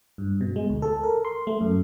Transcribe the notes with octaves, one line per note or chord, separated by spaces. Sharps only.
G2
B2
G#3
D2
A4
A#4
C6
A3
F#2